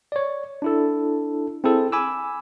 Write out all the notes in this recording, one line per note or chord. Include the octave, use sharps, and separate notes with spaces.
C#5 D5
D4 E4 A4
C4 E4 G#4 A4
G#5 B5 D6 E6